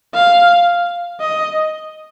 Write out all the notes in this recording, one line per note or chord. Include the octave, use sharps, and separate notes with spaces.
F5
D#5